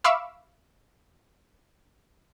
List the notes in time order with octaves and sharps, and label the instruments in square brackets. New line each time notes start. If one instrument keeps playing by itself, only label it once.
[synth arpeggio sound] E5 F5 B5 C#6 D6 E6